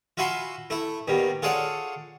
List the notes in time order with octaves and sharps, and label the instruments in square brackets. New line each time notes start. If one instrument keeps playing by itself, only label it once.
[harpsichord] F4 F#4 E5 G#5 B5 C6
A3 E4
D#2 B2 G3
F4 G#4 A4 C#5 D5 F#5